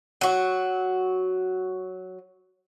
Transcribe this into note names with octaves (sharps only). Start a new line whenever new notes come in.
F#3 F#4